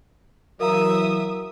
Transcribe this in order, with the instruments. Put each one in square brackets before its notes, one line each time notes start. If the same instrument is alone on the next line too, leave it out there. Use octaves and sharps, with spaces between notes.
[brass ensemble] E3 F#3 [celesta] A#4 F5 A#5 [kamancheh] E5 D#6